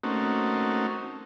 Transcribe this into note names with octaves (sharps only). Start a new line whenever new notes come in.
A3 A#3 C4 C#4 D#4 F#4